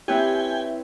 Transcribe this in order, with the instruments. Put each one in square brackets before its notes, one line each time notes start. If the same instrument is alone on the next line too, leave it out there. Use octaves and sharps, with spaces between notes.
[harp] C4 B4 C#5 [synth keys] E4 E5 [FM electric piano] G4 [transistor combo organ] G5 G#5